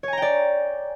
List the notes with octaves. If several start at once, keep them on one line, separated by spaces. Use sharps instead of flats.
C#5 D5 G5 G#5 A#5